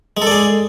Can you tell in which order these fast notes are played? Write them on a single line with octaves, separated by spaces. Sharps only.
G#3 A4 D5 G#4